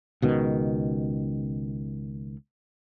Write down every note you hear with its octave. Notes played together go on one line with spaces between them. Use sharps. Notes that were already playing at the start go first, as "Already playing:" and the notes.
C#2 B2 D#3